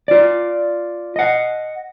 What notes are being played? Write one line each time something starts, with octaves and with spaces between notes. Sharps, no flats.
F4 D5
D#5 F#5